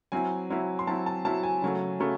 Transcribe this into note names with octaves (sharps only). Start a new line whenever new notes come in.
F#3 C4 E4 G#5
F#3 C4 E4
C6
F#3 C4 E4 A5
A5
F#3 C4 E4 A5
G#5
C#3 F#3 A3
C#3 F#3 A3